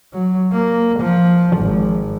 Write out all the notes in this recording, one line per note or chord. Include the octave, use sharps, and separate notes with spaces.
F#3
A#3
F3
G#1